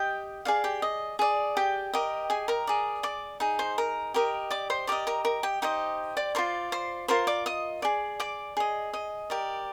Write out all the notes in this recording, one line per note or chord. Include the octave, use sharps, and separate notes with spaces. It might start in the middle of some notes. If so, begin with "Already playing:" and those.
Already playing: G4 D#5 G5
G#4 D5 F5
G4 G5
D#5
G#4 D5
G4 G5
G4 A#4 D#5
G#4 G#5
A#4 A#5
G#4 D5
D5 D6
D#4 G#4
C5 C6
A#4 A#5
G4 A#4 D#5
D5 D6
C5 C6
G4 A#4 D5 D#5 D6
A#4 A#5
A#4 A#5
G4 G5
D#4 G4 C5 D#5
D5 D6
F4 A#4 C5 D5 C6
C5 C6
F4 A#4 C5 C6
D5 D6
D#5 D#6
G#4 D5
D5 D6
G#4 D#5
D#5
G4 A#4 D5